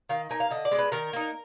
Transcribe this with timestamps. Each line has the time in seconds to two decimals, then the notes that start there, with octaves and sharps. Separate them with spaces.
0.09 D#3 F5
0.30 A#3 D#4 G#5
0.40 F5
0.51 D3 D#5
0.65 D5
0.71 G#3 D4
0.78 B4
0.92 D#3 A#4
1.13 A#3 D#4